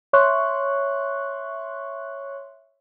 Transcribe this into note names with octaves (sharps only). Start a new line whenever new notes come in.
C#5 E5 C6 C#6 F#6